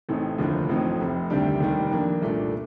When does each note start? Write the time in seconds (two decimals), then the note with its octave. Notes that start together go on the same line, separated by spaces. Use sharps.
0.09 A1 A2 A3 C4 D#4
0.38 F1 D#2 D3 F3
0.69 A1 A2 F3 C4 D#4
1.00 F1 F2 C3
1.30 D2 C3 D#3 G3 D4
1.60 F1 D#2 D#3 G3
1.91 F2 D#3 A#3 D4
2.21 C2 A#2 A3 D4